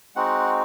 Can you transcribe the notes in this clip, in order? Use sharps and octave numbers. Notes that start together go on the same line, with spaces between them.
G#3 C4 D#4 F#4 F#5